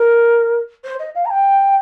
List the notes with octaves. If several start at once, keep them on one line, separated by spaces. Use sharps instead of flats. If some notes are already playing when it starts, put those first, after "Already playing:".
Already playing: A#4
C5
D#5
F5
A#5
G5